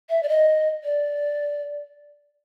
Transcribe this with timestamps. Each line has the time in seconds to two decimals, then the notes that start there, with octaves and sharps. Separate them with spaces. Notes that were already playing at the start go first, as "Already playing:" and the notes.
0.10 E5
0.23 D5
0.29 D#5
0.84 D5